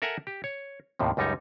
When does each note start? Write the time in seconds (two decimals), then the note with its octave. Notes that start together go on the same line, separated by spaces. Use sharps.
0.02 A4 A#4 E5 F#5 G#5 A#5
0.27 G4
0.44 C#5
0.99 D#2 A2 C3 D#3
1.17 C#2 F#2 G3 D#4 C#5